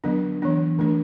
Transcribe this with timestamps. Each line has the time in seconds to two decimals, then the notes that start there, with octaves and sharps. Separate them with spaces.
0.04 D3 F#3 B3 D4
0.42 E3 B3 D4
0.79 D3 A3 D4